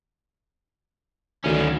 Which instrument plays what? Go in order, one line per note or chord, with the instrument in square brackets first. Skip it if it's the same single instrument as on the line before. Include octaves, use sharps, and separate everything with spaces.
[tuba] D2 [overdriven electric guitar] D#3 C#4